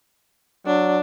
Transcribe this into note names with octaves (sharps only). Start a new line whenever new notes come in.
F#3 D4